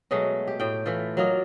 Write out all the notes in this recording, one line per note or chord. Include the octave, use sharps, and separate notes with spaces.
B2 F#3 G#3 A3
G4
A2 G5
E3 A3 F4
F#3 A#3 F4 D#5